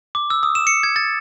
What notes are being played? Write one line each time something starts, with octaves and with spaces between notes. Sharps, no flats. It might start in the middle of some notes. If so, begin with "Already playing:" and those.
D6
E6
D#6
E7
C#7
G#6
A6